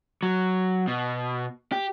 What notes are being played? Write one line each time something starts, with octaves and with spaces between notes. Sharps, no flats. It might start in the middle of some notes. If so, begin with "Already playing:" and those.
F#3
B2
G4